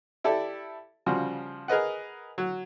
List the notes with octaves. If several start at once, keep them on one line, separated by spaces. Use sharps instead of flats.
E4 G4 A4 D5
C#3 F3 G3 F#4
G#4 A#4 B4 D#5 F#5
F#3